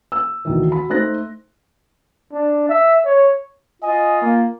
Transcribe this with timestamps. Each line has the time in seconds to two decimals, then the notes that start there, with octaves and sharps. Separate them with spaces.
0.12 E6
0.45 D2 D#3 E3
0.72 F#4 B5
0.89 A3 D#4 C5 F#6 A#6
2.32 D4
2.69 E5
3.05 C#5
3.82 F4 D#5 G#5
4.21 A#3